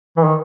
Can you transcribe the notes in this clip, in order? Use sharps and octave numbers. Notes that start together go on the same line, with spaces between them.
E3
D#3